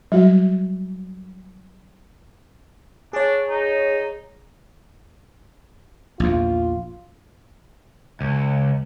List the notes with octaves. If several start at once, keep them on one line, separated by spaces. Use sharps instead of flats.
F#3 G3 F#4
D4 G#4 C#5
D#4
A#1 E2 F4
C#2